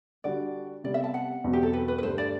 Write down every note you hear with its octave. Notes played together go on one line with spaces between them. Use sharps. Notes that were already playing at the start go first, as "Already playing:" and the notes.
D3 G3 D4 F#4 D5
C3 G3 B3 D5
E5
A5
F#5
E2 B2 F#3 C4
G4
A4
B4
B4
B4
G2 D3 A3 D4 G4 C5
D5